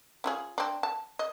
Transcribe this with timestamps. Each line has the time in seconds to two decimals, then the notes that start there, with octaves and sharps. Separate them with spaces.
0.24 C#4 F4 G#4
0.58 C4 D4
0.83 A5
1.19 D#5